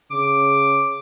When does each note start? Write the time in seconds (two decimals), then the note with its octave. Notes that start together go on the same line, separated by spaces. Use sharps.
0.11 C#3 D6